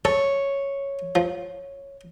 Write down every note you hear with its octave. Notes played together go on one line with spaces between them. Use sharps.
A4 C#5
F3